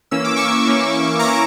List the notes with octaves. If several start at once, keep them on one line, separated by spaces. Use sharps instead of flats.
E3 A#3 C#4 E6
D6
C#6 E6
E3 A#3 C#4
E3 A#3 C#4 A#5 D6